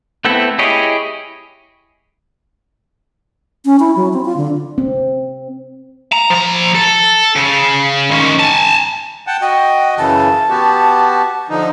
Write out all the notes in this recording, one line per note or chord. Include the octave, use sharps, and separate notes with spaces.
A3 B3 C4 E4 A4
E4 G4 G#4 C#5 D#5
C#4
E4
F#3
C4
F4
D3
C4
A#5
F3 A#5
A4
C#3
D#3 C#4
G#5 A5
F#5 G5 A5
F#4 D#5 G5
F#2 C#3 E3 A5
B3 F#4 G4
D3 F3 D#4